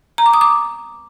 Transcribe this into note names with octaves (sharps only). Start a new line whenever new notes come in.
A#5
D6
D#6
D6